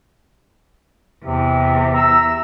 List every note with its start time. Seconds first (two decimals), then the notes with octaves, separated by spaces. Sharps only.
1.25 E2 C3
1.94 E5 A#5 E6